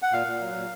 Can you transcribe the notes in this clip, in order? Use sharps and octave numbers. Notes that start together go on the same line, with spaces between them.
F#5
A#2 F5
A#2
F#3
A#2